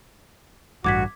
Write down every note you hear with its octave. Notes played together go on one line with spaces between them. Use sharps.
A1 G2 F#4 D6 G#6 B6